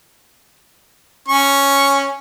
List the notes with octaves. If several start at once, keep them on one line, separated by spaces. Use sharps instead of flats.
C#4 C#6